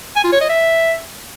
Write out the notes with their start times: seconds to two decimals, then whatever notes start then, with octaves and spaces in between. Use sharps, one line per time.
0.16 G#5
0.24 F4
0.32 C#5
0.41 D#5
0.49 E5